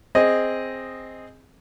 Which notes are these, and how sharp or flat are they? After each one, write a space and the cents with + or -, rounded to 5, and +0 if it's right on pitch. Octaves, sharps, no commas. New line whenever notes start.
C4 +0 G#4 -5 D#5 +0